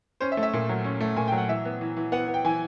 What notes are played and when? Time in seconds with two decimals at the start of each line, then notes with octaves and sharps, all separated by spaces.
0.20 C#4 C5
0.32 E5
0.37 A3
0.43 E5
0.53 A#2
0.69 F#3
0.84 C#4
1.00 A3
1.16 A#2 G#5
1.28 G5
1.32 F#3
1.37 F#5
1.48 E3 E5
1.65 B3
1.81 E3
1.97 E3
2.12 B3 F#5
2.28 B3
2.34 G5
2.45 E3 G#5